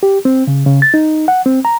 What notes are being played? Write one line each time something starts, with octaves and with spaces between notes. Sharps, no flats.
G4
C4
C#3
C#3
A6
D#4
F#5
C4
A#5